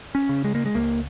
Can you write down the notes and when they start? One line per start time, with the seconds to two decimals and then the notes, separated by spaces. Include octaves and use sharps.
0.15 C#4
0.29 C#3
0.44 G#3
0.55 A#3
0.66 G#3
0.75 C#2 A#3